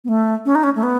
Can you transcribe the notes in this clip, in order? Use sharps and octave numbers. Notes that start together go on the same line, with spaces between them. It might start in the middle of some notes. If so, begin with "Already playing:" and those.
B3
A3
C#4
D#4
C#4
A3
B3